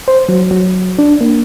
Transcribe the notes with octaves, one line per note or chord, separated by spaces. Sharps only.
C5
F#3
F#3
D4
A#3